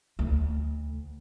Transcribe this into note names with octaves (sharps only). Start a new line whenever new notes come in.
D2